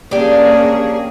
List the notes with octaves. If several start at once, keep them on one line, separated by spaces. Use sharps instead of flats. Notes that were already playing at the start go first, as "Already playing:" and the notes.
A#3 C#4 D4 G4 G#4